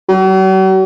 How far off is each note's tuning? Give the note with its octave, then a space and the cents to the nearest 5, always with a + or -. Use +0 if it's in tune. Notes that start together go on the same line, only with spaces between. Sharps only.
F#3 +45